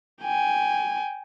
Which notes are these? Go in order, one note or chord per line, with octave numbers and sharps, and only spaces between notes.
G5 G#5